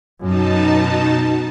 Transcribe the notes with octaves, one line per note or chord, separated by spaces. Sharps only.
F#2 B2 D#4 A5